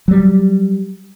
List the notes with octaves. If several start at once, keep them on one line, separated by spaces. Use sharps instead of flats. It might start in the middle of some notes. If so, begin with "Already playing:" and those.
F#3 G3